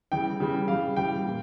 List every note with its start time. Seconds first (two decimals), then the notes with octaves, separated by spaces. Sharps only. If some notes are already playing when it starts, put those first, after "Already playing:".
0.12 C#3 E3 G3 G5
0.40 C#3 E3 G3
0.68 C#3 E3 G3 F5
0.96 C#3 E3 G3 G5
1.25 A#2